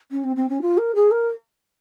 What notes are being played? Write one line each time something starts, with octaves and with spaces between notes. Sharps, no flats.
C#4
C4
C4
C#4
F4
A#4
G#4
A#4